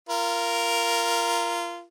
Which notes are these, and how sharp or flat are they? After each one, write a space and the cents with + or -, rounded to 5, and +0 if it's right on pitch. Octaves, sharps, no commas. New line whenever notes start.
F4 -20 A#4 +0